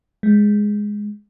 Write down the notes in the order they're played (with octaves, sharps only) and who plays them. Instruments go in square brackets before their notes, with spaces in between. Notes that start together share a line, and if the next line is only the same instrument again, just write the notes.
[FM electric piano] G#3